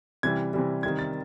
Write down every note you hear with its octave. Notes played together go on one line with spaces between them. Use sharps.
C3 E3 G3 G#6
C3 E3 G3
C3 D#3 G3 G#6
A6